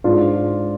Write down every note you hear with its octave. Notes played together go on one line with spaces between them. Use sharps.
G#2 D4 F4